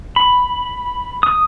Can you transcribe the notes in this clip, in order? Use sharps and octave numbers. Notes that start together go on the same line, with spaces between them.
B5
D#6